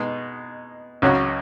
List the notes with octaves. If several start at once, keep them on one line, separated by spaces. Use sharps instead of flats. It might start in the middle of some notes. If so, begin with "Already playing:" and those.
Already playing: B2 G#3 B3 D#4
C#2 C#3 F#3 C#4 F#4